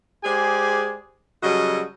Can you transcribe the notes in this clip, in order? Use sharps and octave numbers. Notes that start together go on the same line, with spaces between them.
G#3 G4 G#4 C5 D5 G#5
C#3 F#3 G3 F#4 A4 D#5